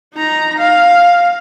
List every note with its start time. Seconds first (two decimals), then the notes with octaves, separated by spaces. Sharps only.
0.14 D#4 A#5
0.59 F5